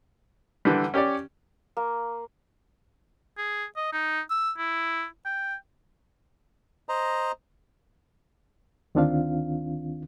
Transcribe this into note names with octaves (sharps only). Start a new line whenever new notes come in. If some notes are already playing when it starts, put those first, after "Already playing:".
D3 E3 G3
C#4 G4 C#5 D5
A#3
G#4
D#5
D#4
E6
E4
G5
C5 D#5 A#5
D2 D#3 C4 D4 F4 F5